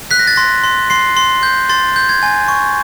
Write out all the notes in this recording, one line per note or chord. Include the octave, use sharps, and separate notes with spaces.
F#6 B6
A#6
A6
C6 A#6
C6
C6 C7
C6
G6
C6 A6
G6
G#6
G#5
C#6